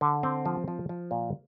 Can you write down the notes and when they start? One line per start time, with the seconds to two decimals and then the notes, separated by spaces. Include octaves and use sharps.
0.01 D3
0.23 C4
0.46 F3
0.68 F3
0.89 F3
1.11 A#2